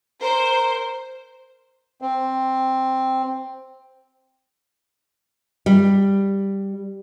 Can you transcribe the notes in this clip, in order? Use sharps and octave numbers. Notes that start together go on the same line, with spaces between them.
A#4 C5
C4
G3